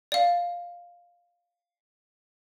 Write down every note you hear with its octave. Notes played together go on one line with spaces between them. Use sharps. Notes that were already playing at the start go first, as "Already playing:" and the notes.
D5 F5